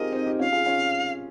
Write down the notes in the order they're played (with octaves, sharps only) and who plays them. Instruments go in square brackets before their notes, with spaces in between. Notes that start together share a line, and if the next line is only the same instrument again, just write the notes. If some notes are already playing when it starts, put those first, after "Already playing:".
Already playing: [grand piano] C4 D#4 F4 G4 G#4 A#4 [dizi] D#5
[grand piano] C4 D#4
D#4 G4
[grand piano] C#4 F4 [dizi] F5
[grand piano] F4 G#4
C#4 F4